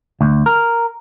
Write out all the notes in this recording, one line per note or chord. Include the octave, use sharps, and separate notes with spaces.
D2
A#4